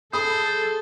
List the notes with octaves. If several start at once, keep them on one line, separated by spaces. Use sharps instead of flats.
G#4 A4 C5 B5 D#6